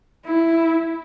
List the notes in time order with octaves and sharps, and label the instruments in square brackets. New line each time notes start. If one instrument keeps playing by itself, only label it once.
[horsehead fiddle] E4